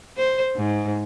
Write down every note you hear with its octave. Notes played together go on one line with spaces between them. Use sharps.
C5
G#2